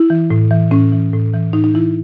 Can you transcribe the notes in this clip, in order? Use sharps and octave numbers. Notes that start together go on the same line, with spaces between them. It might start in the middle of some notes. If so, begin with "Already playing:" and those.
Already playing: E4
E3
A2
E3
A2 C#4
E3
A2
E3
A2 D#4
D#4
E3 E4